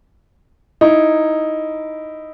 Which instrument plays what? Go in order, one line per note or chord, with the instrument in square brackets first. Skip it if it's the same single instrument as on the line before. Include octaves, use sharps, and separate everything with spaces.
[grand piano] D#4 E4